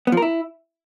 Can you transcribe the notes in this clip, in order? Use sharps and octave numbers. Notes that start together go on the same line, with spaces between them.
B3
F3
A#4
E4